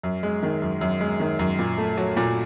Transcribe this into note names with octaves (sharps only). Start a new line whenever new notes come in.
F#2
G#3
D#3
F#2
F#2
G#3
D#3
F#2
A#2
A3
F#3
A#2